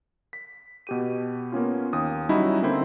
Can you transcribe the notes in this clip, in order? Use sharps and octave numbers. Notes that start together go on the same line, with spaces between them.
B6
B2 G4 D#7
A#3 B3 C#4 F4
D#2 D#6
F#3 G3 C#4 D#4 E4 F#4
D3 A#3 C4 E4 C5